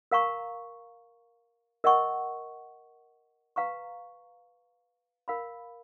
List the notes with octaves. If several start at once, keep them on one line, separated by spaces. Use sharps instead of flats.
A#4 F5 A#5 C#6
A#4 D#5 F#5 C#6
B4 F5 A#5 C#6
A#4 F5 B5